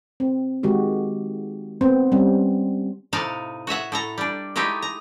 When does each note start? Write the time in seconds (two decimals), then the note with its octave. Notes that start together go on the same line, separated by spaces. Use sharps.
0.20 C4
0.63 D#3 G#3 F#4 G4
1.81 B3 C4 C5
2.12 G3 C4 C#4
3.13 A2 C3 D#4 F5 A5
3.67 F#4 C#5 E5 F#5
3.92 A2 A4 A#5
4.18 G3 D4
4.56 G#3 A3 D#4 E4 G4
4.82 A#5